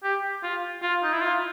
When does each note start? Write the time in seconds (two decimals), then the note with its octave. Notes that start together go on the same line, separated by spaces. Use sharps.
0.03 G4
0.43 F4
0.82 F4
1.04 D#4
1.13 E4
1.21 F4